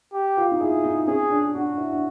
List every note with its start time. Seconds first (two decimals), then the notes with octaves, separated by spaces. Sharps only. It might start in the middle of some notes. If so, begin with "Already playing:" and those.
0.13 G4
0.37 F4
0.52 D#4
0.60 E4 G#4
0.84 D#4
1.07 C#4 G#4
1.30 D4
1.54 D4 F#4
1.77 E4
1.92 D4